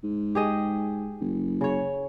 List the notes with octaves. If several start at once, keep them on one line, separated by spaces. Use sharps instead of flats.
G#2
G4 G#4 D#5
F#1
C#3 C#5